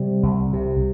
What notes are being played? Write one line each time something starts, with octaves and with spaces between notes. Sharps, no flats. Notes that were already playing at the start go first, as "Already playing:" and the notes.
Already playing: C3 G3
C2
C3